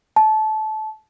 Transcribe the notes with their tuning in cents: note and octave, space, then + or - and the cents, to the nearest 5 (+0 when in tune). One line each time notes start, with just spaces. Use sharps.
A5 -20